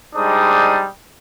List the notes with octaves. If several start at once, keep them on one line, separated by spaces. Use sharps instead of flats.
G3 G#3 D4 D#4 C5 D#6